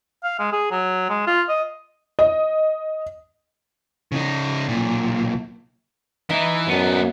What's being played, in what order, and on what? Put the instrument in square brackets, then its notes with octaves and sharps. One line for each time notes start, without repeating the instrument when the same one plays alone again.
[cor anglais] F5
G#3
G#4
F#3
G#3
F4
D#5
[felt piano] D#5
[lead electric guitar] C#3 D#4
B1 A#2
[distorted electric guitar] E3 E4 [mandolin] D#4 D#5 B5
[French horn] F#2 [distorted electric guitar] B3 D4